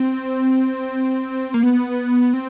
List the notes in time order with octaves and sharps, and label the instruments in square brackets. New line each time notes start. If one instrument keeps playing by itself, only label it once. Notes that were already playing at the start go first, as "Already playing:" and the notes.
Already playing: [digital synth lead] C4
A#3
B3
C4